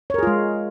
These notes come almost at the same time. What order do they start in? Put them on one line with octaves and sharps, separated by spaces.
C#5 A#4 G#4 F4 G#3